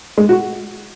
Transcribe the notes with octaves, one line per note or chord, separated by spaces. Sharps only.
G#3
F#4